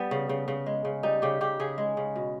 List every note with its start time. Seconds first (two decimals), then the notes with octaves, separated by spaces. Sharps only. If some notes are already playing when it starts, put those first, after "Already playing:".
Already playing: G3 B3
0.11 C#3
0.29 C#3
0.48 C#3
0.66 G#3
0.85 C#3
1.03 G3 D#4
1.22 C#3 G4
1.41 C#3 G4
1.60 C#3 G#4
1.78 G#3
1.97 C#3
2.16 B2